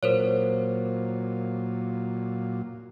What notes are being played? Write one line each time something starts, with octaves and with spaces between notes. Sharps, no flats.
A#2 F#3 F4 A#4 C5 C#5